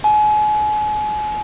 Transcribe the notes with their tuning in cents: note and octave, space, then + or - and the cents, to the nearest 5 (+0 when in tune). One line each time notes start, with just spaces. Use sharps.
G#5 +35